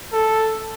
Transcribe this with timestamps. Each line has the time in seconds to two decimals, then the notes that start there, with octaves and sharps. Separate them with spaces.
0.13 A4